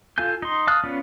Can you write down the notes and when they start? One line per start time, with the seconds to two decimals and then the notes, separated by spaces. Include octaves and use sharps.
0.18 F4 A4 F5 G#5 G6
0.42 D#4 C6
0.67 F5 A5 D#6 F6 F#6
0.84 B3 C#4 F4 D5